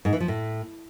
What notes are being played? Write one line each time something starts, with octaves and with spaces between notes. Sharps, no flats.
G#2
E3
F3
A2